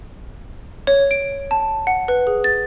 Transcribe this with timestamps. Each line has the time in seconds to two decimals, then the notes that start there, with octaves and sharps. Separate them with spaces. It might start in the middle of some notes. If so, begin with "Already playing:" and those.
0.87 C#5
1.11 D7
1.51 A5
1.87 F#5
2.08 B4
2.27 G#4
2.44 A6